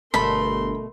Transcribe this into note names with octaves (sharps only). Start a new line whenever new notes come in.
G1 B2 A3 A4 A#4 B5 C6